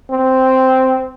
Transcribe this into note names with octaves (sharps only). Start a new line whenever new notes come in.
C4